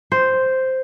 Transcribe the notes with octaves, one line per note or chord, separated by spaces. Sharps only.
C5